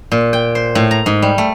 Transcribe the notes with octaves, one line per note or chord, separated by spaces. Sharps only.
A#2
G5
C5
A2
A#5
G#2
G3
A3